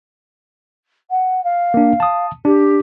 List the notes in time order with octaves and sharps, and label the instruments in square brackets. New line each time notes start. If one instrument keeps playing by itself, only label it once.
[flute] F#5
F5
[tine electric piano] A#3 D4
A5 D#6
[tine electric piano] D4 [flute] G4